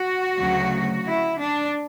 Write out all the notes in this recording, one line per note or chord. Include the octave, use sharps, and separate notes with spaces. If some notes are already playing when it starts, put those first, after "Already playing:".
Already playing: F#4
D2 C#3 F#3
E4
D4